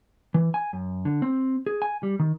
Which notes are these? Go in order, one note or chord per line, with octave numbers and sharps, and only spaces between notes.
E3
G#5
F#2
D3
C4
G#4
G#5
G3
D#3